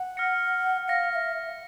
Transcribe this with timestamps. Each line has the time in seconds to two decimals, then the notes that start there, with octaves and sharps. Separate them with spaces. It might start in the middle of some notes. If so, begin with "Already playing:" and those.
Already playing: F#5
0.17 F6 A#6 C#7
0.88 F5 F6 A#6 C#7
1.12 F5
1.15 E5